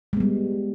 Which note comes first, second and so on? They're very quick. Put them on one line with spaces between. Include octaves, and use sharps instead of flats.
G#3 B3 G3